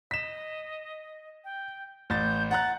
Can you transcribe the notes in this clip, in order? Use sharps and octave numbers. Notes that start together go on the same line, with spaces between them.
D#5 B6 E7
G5
A1 G6 A6
F#5 A#5 F#6 A6